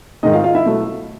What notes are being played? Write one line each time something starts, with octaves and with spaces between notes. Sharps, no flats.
G#2 D#3 G#3 D#4 D#5
F4 F5
F4 F5
E4 E5
B2 F#3 A3